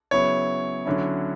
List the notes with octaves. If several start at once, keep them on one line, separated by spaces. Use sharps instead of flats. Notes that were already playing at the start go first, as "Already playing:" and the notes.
C#3 F#3 B3 E4 C#5
D3 F#3 C#4 E4